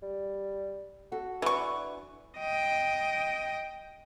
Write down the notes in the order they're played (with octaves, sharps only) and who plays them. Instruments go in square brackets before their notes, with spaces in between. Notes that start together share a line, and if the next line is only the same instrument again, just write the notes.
[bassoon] G3
[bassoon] F#4 [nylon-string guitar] A4
[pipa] E3 C#6 [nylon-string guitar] D4 B4
[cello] D#5 G5